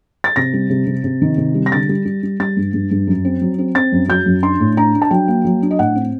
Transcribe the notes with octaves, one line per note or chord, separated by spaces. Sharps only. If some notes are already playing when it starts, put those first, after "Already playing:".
A6
C3 A#6
G3
C3
C3
C3
D#3
C3
G3
A#6
D3 A6
G3
G3
G3
G3 A6
G2
G2
G2
F#2
C4
F#3
C4
C4 A6
F#2
F#3 G6
F#2
D4 C6
A2
D4 A#5
D4
A5
F#3 G5
A#3
F#3
D4
D#5
A2 F#5
C4